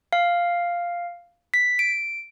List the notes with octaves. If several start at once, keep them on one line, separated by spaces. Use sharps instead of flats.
F5
B6
D7